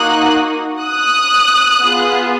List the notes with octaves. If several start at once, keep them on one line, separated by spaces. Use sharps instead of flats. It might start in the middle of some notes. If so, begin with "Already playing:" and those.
Already playing: A#3 D#4 F#4 D#6 F#6
D#6 F#6
B3 F4 G#4